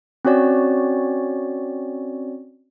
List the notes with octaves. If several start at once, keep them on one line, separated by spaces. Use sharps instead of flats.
C4 C#4 F#4 C#5 D5